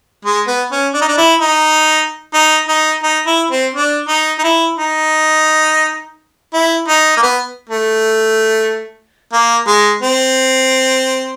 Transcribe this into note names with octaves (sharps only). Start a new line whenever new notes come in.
G#3
B3
C#4
D4
D#4
D4
E4
D#4
D#4
D#4
D#4
E4
C4
D4
D#4
D#4
E4
D#4
E4
D#4
A#3
B3
A3
A#3
G#3
C4